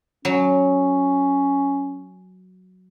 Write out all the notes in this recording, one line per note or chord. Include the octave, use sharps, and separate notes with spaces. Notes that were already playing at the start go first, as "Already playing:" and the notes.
F#3 C#4